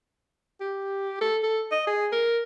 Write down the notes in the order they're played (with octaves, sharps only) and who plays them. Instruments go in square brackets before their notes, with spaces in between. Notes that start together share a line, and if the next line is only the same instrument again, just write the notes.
[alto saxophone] G4
A4
A4
D#5
G#4
A#4